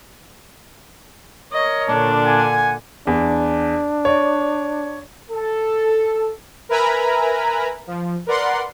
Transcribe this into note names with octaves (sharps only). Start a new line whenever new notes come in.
A#4 C#5 D#5
A#2 D3 D4
F#5 G#5
E2 D4
C#5 D5
A4
A#4 B4 E5 G#5 A#5 B5
F3
A#4 B4 D5 F#5 C6